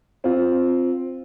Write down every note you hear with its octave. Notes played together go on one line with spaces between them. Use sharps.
C4 F4